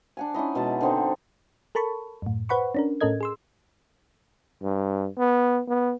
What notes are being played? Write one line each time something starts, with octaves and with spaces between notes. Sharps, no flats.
D4 F#5 G#5
C#4 D#4 E4 D#5
B2 G#3 A5
D3 C4 D#4
A4 A#4 A5 B5 C#6
F#2 A2
B4 C5 F#5 B5 C#6
C#4 D4 A#4
A2 C#4 A4 A#4 D#5 G#6
G#4 C6 E6
G2
B3
B3